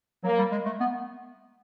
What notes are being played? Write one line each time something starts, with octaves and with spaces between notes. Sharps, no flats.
F#3 A#3
G3
G#3
A3
B3